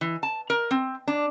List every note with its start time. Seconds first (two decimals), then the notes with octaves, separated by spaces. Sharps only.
0.01 E3
0.23 A5
0.50 A#4
0.71 C4
1.08 D4